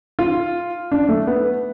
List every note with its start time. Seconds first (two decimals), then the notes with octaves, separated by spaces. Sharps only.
0.19 F4
0.92 D4
1.09 A3
1.27 B3